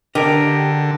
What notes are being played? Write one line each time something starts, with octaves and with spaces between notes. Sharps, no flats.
D3 D4 G4 A#4 D#5 A#6 D7